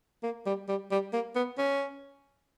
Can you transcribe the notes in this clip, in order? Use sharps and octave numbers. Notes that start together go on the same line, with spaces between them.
A#3
G3
G3
G3
A#3
B3
C#4